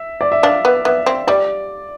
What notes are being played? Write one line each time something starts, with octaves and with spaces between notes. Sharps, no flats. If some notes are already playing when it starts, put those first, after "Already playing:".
Already playing: E5
D5
E5
D4 F5
B3
B3 E5
C4
G3 D5